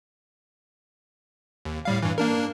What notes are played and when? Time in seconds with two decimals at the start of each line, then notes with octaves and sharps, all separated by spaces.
1.65 D#2
1.85 A2 G3 F5
2.02 G2 E3
2.18 A#3 D4 A#4